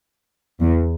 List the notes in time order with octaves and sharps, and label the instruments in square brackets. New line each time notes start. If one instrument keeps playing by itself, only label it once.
[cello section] E2